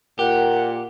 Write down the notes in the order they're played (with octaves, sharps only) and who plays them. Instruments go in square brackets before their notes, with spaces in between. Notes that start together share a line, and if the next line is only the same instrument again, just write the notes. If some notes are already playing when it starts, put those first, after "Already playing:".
[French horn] A#2 [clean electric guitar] G4 [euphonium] A#4 [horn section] F#5